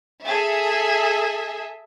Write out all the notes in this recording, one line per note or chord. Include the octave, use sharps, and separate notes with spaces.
G#4 A4 E5